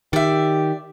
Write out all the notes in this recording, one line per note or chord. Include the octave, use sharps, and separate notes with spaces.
D#3 G4 D5 E5